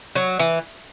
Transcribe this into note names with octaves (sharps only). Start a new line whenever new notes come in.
F#3
E3